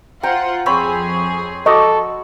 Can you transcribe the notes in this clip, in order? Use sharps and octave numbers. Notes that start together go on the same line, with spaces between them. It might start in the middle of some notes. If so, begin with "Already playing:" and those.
F4 C5 F#5 G5 A#5
F2 F3 C4 G#4 C#5 B5
F#4 A4 D#5 C#6 D6